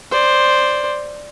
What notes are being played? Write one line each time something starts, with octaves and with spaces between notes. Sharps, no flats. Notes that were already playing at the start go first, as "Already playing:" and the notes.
C5 D5